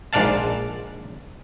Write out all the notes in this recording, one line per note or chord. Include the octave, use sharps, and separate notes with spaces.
A#1 G#2 D4 D5 F5 A5